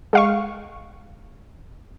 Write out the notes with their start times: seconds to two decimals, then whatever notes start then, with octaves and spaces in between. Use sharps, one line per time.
0.13 G#3 F5 C#6